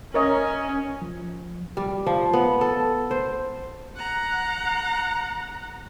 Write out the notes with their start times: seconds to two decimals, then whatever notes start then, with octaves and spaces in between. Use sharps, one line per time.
0.14 C#4 A#4 C#5 D#5
1.02 F3
1.77 G3
2.06 F3
2.33 B3
2.61 A4
3.11 C5
3.97 F#5 A#5